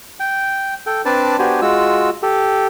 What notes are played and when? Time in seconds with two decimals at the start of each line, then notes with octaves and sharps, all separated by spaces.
0.20 G5
0.86 A4 G5
1.05 C4 D4 B4 D5 A5
1.39 B3 D4 F#4 G4 C5 G#5
1.62 G#3 F4 F#4 E6
2.23 G4 A4